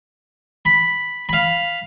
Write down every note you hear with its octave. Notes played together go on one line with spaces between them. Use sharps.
B5
F5 B5